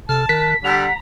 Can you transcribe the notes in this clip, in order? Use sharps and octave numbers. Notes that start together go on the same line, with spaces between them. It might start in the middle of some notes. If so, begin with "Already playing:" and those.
C3 A4 A5 F6
D#3 A#4 F#6 B6
D3 G3 F#5 A#5